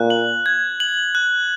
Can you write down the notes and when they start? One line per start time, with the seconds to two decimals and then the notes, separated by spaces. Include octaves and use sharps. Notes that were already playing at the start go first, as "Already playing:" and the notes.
Already playing: A#2 F#6
0.10 F#7
0.46 G#6
0.80 F#7
1.15 F#6